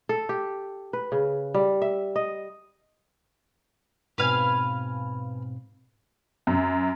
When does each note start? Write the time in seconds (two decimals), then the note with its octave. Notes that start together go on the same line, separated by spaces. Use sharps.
0.09 A4
0.29 G4
0.93 B4
1.12 C#3
1.54 G3
1.82 E5
2.16 D#5
4.18 G#2 B2 C4 B4 F5 G#5
6.47 F#2